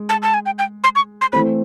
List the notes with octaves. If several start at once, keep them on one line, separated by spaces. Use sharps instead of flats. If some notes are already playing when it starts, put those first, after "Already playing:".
Already playing: G#3
A5
A5
G#5
G5
G5
C6
C#6
C6
E3 A3 C4 B5